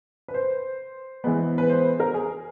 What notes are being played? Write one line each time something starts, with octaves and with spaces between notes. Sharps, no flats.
B4
C5
E3 G#3 B3
B4
C5
A#4
G#4